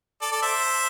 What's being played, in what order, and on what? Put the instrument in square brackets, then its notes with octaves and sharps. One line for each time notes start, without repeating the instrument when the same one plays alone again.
[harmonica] A4 D5
A4 D5
C5 E5